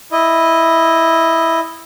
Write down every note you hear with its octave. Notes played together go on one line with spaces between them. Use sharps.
E4 D#5